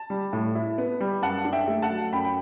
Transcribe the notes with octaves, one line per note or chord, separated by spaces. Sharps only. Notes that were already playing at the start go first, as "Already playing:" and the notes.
Already playing: A5
G3
A2
E4
B3
G3
F#2 F#5 A5
D4
E5 G5
A3
F#5 A5
F#3
F#2 G5 B5
G5